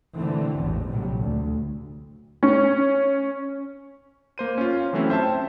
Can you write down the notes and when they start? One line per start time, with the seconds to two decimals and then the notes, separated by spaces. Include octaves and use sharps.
0.16 B2 D3 E3 A3 C4
0.59 A1 E2 A2
0.89 A#1 A2 C3 F#3 G3
1.18 D2
2.43 C#4
4.38 A#3 C5 D#7
4.58 C#4 F4
4.93 E3 F#3 A3 C4 C#4 E4
5.10 C5 E5 G5 A5